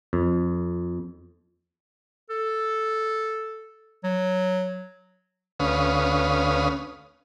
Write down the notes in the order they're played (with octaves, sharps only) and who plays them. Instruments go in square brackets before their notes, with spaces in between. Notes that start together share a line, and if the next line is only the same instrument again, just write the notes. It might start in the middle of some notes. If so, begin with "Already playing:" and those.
[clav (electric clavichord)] F2
[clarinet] A4
F#3
[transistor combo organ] D2 C#4 B4 F5 D#6